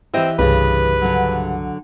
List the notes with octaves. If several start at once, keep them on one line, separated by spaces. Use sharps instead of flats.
E3 C4 E4 G4 D#5
C2 G2 C#3 B4
D3 F#3